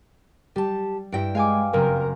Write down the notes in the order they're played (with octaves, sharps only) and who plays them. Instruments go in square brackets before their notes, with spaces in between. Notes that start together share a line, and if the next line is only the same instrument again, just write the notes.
[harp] G3 [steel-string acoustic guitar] G4 A5
[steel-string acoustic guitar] G2 G5 [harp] E4 A#6 D7
[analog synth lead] G#3 [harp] F5 G#5 D6
[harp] F#1 C4 [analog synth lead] A#4